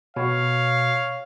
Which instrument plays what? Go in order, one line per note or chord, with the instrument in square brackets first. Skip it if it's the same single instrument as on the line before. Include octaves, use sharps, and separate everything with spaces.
[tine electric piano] B2 [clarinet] C#5 [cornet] F5